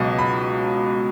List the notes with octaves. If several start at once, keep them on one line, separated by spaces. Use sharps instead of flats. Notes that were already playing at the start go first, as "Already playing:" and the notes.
Already playing: C#2 B2 F#3
B5